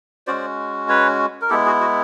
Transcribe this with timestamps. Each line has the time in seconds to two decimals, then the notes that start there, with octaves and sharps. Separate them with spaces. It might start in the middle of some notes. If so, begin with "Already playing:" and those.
0.27 G#3 C#4 F#4 C5 D5
0.89 B4 C#5
1.42 A#4
1.50 G#3 B3 E4 G4 A4
1.66 F#4 G#4
1.81 F#4